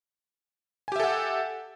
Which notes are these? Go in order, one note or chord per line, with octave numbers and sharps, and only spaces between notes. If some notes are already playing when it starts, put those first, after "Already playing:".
G4 A4 E5 F#5 G#5